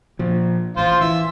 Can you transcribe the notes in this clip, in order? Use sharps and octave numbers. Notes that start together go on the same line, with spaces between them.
A#2 F3
A1 F4 C5
E3 E5